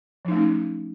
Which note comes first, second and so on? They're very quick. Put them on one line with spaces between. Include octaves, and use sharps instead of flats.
F3 D#4 A3 C#4